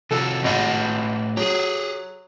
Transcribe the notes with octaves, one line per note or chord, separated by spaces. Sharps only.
C3 F3 F#4 A4
G#1 A2 G4 F#5
F#3 G4 G#4